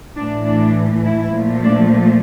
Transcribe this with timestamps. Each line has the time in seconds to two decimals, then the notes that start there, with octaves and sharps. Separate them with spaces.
0.17 A2 E3 A3 D4
0.46 D4
1.04 E4
1.35 A#2 F3 A3
1.63 D4